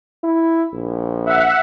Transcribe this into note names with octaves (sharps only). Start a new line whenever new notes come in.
E4
A#1
E5 F#5